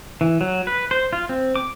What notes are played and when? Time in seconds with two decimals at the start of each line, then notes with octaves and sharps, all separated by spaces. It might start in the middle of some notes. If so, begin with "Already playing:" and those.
0.21 E3
0.41 F#3
0.67 B4
0.91 C5
1.13 F4
1.29 C4
1.56 D6